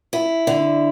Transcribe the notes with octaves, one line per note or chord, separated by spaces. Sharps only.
E4
D3